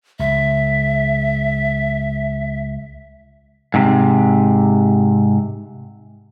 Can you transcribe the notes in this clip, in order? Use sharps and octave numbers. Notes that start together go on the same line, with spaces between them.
C#2 E5
G#2 C3